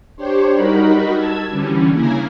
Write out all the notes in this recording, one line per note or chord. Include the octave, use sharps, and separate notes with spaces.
D4 G4 C5 C#5
G3 D#4 F#4 A#4 B5
A5 E6 G#6
D3 E3 G3 C#4
C#3 A#3 E4 G#5 A#5